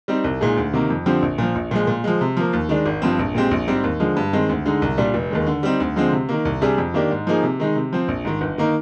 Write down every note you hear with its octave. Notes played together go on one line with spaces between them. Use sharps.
G3 C4 D#4
C2
A#2 G#3 D#4 G#4
D2
C3 D#3 A#3
F2
D3 F3 C4 G4
A#1
A#2 F3
A#1
A#2 F3 G#3
A#2
F3 G#3
C3
F3 A#3
D#2
D#3 G#3 D4
G#1
G2 F3 C4
A#1
A#2 G#3 C4 G4
A#1
G#2 G3 C4 G4
D#2
D3 F3 G#3
G2
D#3 G#3 C4
D2
D3 G#3 D#4
C2
A#2 G3 D4
F1
D#2 D#3 G#3
D3
G3 C4 D#4
D2
D3 F3 G#3 C4
C3
D#3 A#3
C2
C3 G3 D4 G#4
F2
D#3 A#3 D4 G4
G#2
F3 A#3 D#4 G#4
C3
D#3 G#3 D#4
C3
F3 C4
A#1
G#2 D#3
G1
D#3 A#3 D#4